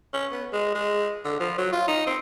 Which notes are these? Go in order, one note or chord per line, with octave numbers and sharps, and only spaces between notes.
C#4
B3
G#3
G#3
D3
F3
F#3
F4
D#4
C4